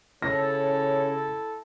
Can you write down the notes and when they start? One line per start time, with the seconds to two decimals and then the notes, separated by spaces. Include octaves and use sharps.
0.22 C#3 E4 A4 C#5 A#6